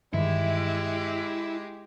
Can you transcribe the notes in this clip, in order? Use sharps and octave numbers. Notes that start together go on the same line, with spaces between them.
G2 D#3 E3 G#3 E4 G4